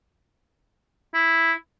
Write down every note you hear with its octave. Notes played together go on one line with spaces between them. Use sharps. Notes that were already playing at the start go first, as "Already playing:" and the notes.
E4